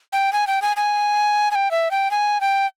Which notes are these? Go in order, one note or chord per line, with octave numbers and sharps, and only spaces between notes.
G5
G#5
G5
G#5
G#5
G#5
G5
E5
G5
G#5
G5